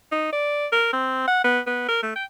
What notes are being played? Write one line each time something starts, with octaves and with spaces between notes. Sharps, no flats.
D#4
D5
A#4
C4
F#5
B3
B3
A#4
A3
G5